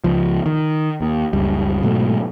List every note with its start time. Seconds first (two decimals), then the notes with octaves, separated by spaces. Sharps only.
0.04 C#2 F3
0.46 D#3
1.01 D#2
1.33 F#1 C#2 G3
1.83 G#2 B2 F#3 A3